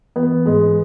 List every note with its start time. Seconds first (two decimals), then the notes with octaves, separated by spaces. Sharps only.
0.16 E3 B3
0.46 G#2 G#3 G#4